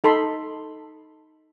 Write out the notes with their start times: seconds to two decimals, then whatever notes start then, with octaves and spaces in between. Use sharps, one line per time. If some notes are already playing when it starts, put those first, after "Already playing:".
0.04 D#4 A4 B5 C6